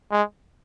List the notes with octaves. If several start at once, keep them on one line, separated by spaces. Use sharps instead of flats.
G#3